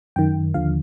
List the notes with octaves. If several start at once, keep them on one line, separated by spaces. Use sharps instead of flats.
F#2 D#3 G5
D#2 D3 F3 F5